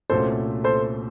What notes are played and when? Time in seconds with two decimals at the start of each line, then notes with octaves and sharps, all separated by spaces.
0.10 C2 A#2 A3 C#4 F#4 A4 C5
0.64 A4 C5